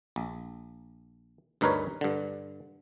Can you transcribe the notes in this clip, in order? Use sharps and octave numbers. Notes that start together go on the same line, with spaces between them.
A#1
D2 G2 D#4 A#4 B4 C#5
G2 D3